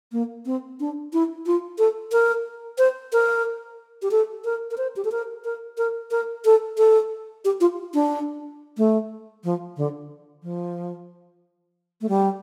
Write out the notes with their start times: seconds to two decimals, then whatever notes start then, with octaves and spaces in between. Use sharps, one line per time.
0.12 A#3
0.46 C4
0.80 D4
1.13 E4
1.46 F4
1.78 A4
2.12 A#4
2.78 C5
3.13 A#4
4.02 G4
4.11 A4
4.45 A#4
4.71 A#4
4.78 C5
4.96 G4
5.05 A4
5.12 A#4
5.44 A#4
5.78 A#4
6.11 A#4
6.45 A4
6.78 A4
7.45 G4
7.61 F4
7.94 D4
8.77 A3
9.44 F3
9.77 D3
10.43 F3
12.01 A3
12.09 G3